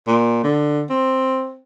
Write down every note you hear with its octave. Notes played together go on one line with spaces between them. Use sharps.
A#2
D3
C4